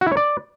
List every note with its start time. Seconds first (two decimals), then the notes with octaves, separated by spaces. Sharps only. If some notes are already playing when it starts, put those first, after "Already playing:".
0.01 F#4
0.06 E4
0.12 C#5
0.17 D5